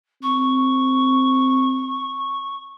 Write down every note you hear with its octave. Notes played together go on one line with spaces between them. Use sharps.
C4 C#6